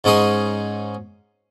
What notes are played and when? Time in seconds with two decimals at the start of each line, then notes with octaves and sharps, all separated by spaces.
0.04 G#2 C#4 D#4 G#4 C6 D#6